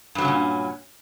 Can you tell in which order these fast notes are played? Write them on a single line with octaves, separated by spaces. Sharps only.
G2 F#3 C#3 C#4 A#2